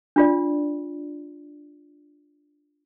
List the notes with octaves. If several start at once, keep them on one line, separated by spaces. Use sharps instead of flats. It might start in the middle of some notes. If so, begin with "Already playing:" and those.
D4 F4 D5